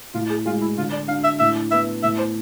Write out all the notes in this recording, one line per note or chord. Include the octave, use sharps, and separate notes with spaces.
A2 F4
G#4
G#3 F4
E4
D3 F4
D5
D4 F5
E5
A2 E5
B3 E5
A2 E5
C5